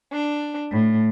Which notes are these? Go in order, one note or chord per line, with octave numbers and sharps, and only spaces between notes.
D4
A2